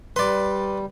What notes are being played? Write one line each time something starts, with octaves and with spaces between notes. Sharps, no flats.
G3 B4 D5 C6